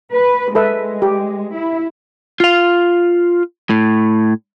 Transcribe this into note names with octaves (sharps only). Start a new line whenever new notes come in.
B4
G#3 A4 B4 E5
G4
E4
F4 F5
A2